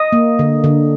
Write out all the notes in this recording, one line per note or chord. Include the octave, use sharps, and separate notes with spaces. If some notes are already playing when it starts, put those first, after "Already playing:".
Already playing: D#5
A#3
D3
D3